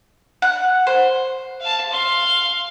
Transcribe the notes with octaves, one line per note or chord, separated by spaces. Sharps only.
F#5
C5
F5 A5
F5 C6